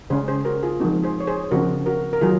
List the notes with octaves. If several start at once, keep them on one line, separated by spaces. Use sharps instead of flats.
C#3 G#3 C#4 G#4 C5
G#4 C5
F#4 A#4
F4 G#4
F3 G#3 C4 D#4 F#4
G#4 C5
C#5
G#4 C5
C#3 F3 C4 F#4 A#4
F#4 A#4
A#4
D#3 F#3 F4 G#4